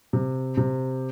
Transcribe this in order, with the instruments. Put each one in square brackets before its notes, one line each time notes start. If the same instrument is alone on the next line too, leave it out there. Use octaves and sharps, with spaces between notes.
[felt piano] C3
C3